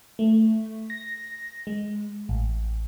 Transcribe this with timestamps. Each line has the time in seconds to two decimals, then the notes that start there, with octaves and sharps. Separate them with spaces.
0.19 A3
0.90 A#6
1.67 G#3
2.29 A1